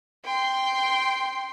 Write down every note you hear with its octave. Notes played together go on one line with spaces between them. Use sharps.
G5 C6